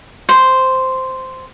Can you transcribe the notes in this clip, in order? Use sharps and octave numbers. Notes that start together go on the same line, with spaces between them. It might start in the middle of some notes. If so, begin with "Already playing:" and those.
C5